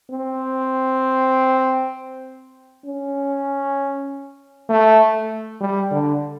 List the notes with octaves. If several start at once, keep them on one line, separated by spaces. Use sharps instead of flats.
C4
C#4
A3
G3
D3